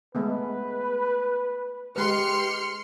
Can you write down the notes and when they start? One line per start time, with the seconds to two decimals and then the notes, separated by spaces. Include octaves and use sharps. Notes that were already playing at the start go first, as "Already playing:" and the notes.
0.15 G#3 A3 B3 B4
1.96 G#3 G4 B4 C6 F6 C#7